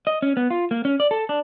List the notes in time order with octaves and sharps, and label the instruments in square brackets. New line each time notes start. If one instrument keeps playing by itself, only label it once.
[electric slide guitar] D#5
C#4
B3
F4
A#3
C#4
D5
A4
D4